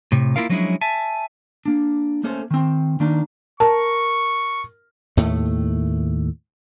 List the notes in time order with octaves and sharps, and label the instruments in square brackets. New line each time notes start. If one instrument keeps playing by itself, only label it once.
[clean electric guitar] A2 C3
A#3 B3 E4 F4 A#4 F5
F3 F#3 G#3 C#4 D4 E4
E5 G#5 A5
[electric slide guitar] A#3 D4
A3 A#3 C#4 A4 C5
D#3 C4
D#3 A#3 D4 D#4
[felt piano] A#4 [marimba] A5 [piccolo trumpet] C#6
[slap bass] D#2 A2 A3